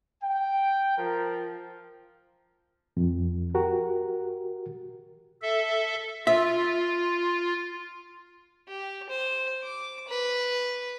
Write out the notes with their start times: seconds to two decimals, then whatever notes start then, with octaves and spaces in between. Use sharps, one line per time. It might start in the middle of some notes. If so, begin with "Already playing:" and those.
0.23 G5
0.98 F3 F4 A#4
2.97 F2
3.55 F#4 G4 A#4
5.42 A4 E5
6.27 F4 E5
8.69 G4
9.10 C5
9.63 D6
10.08 B4